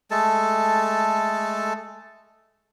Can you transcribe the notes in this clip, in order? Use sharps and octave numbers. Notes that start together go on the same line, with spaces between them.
G#3 A3 A4 A5